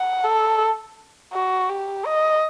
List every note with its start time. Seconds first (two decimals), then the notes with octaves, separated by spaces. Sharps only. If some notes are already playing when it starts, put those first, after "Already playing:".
Already playing: F#5
0.24 A4
1.33 F#4
1.70 G4
2.06 D#5